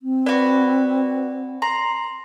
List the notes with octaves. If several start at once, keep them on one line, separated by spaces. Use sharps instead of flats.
C4
F#4 B4 D5
A#5 C6